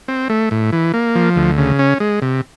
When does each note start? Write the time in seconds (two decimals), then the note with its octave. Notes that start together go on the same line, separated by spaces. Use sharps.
0.08 C4
0.29 A3
0.51 A2
0.72 E3
0.94 A#3
1.15 F3
1.36 D2
1.58 C#3
1.79 C#4
2.00 G#3
2.22 C3